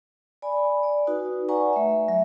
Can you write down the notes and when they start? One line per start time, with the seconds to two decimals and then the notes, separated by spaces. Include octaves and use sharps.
0.42 D5 G#5 B5
0.83 D5
1.07 D#4 F#4 B4
1.48 B4 D5 F#5 G#5 A#5 C#6
1.73 A3 E5
2.08 F#3 E5